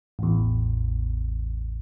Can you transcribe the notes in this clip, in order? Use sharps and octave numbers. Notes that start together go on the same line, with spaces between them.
A1 E2